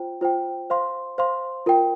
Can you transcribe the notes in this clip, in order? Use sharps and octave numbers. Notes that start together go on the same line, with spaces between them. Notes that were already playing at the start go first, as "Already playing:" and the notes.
Already playing: F4 C5 G5
F4 C5 G5
C5 F5 C6
C5 F5 C6
F4 A#4 G5